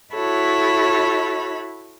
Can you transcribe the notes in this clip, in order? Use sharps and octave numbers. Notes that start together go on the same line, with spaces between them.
E4 F#4 A4 C#5 B5